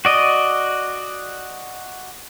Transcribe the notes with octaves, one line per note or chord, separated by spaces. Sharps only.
F#4 D5 D#5